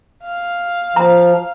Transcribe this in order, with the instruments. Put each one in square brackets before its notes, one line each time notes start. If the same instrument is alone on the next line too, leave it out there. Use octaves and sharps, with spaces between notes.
[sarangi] F5
[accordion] F3 [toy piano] A#5